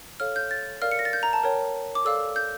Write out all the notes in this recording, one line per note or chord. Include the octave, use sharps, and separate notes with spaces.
A4 C#5 F5 F6
G6
A6
A#4 D5 F5 F6
C#7
A#6
A6
G6
A#5
A5
A#4 C#5 G5
D6
A4 D5 F5 E6
G6